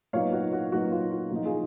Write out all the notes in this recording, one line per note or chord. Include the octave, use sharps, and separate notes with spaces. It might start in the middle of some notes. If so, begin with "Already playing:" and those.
A#2 F#3 B3 D#4 C#5 F5
F#4
F#4
A#2 F#3 B3 D#4 F#4
F4
F#4
A#2 F3 A#3 D#4 F#4
F4 G#4